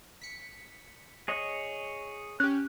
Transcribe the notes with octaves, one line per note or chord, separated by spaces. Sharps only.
B6 C#7
G#4 C#5 D#5
C#4 G4 F#6